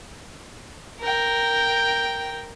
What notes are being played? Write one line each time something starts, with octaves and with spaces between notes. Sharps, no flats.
A#4 G5